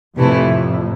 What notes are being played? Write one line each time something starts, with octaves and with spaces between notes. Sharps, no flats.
F2 A2 C3 E3 A3 E4